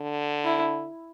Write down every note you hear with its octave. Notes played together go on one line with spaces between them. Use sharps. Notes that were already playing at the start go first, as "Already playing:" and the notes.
Already playing: D3
E4